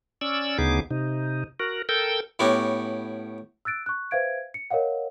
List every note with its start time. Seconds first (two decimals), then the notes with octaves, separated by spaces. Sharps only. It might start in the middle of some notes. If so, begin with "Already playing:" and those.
0.21 C#4 D5 E6
0.58 D2 C#3 B3 D#4 G#4 D6
0.90 C3 D#4
1.60 F#4 A#4
1.89 A4 A#4 G5 E6 G6
2.39 A2 B3 C#4 F#4 G4
3.65 E6 F#6 A6 D7
3.86 C#6 F#6
4.11 B4 C5 E5 F5 G#6 D7
4.54 C#7
4.71 A#4 C#5 D#5 F5 F#5